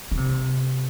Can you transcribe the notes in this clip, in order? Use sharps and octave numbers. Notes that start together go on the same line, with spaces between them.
D3
C3